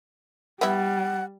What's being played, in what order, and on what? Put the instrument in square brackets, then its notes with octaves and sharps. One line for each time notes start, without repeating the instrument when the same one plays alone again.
[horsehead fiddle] G3 [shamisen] B3 E4 [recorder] F#5